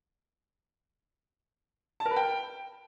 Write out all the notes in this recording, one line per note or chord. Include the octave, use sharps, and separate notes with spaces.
A5
A#4
B4
G5